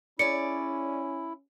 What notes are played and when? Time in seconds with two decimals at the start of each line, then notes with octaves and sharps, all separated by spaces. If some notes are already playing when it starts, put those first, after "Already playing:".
0.19 C#4 E4 G#4 C#5 D5 C#7